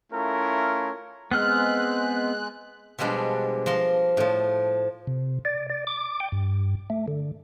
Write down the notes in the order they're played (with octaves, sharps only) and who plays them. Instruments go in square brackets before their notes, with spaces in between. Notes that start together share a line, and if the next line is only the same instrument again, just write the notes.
[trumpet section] A3 C#4 E4 F4 A#4
[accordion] G#3 F#6 [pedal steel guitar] B3 C4 F6
[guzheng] B2 F3 G3 G#3 D4
F3 A#4 C6
A2 F3
[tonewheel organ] C3
D5
D5
D6
G5
G2
A3
D3